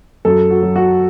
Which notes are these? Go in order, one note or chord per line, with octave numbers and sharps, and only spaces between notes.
F#2 A4
F#4
F#3
F#4